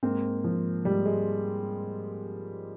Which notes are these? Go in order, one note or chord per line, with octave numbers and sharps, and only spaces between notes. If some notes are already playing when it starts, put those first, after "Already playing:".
G#2 A#3 C4
F3
G#2 G3
G#3